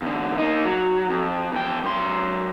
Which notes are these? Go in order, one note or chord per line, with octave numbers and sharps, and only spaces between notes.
E2 D3
A#3 D#4
F#3
F2
E2 G5
F#2 C6